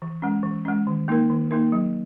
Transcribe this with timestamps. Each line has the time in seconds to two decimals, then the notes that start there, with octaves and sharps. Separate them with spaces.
0.02 E3
0.22 G#3 C#4
0.43 E3
0.65 G#3 C#4
0.87 D#3
1.08 A#3 D#4 A#4
1.30 D#3
1.51 A#3 D#4 A#4
1.72 F#3